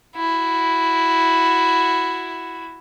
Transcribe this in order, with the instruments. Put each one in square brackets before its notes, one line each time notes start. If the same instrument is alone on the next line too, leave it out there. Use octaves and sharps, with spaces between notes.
[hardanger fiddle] E4 F#4